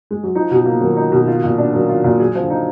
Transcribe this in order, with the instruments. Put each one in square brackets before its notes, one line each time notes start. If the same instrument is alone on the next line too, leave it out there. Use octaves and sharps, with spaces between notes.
[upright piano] G#3
F#3
[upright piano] F3 [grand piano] D#4
[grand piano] B2
A#3
[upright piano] D#3 [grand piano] F#3
[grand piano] D#4
B2
F4
A#2
D4
[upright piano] D#3 [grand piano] F#3
[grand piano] F4
A#2
[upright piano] F#3 [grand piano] G#4
[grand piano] F3
[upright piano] D3
[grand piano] D#4